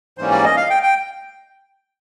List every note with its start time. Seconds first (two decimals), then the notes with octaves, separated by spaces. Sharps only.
0.18 G#2 E3 G3 A#3 C#4 C5
0.31 D5
0.44 D#5
0.57 F5
0.70 G5
0.83 G5